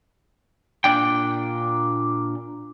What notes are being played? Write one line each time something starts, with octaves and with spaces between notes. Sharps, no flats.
A#2 D4 G5